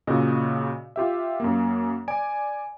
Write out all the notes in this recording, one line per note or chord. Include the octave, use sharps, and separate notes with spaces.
A#2 C#3 F#4 D#5
F4 G4 E5
F#2 A#3
D5 G#5 D7